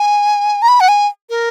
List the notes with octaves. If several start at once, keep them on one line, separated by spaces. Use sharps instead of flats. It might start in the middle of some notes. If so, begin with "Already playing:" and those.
Already playing: G#5
A#5
B5
F#5
G#5
A#4